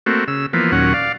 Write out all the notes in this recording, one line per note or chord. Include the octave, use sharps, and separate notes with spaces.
A3 A#3 C4 F#4
C#3 E6
E3 F3 A#3 B3
D#2 A#2 F#3 C#4 F#5
D5 F5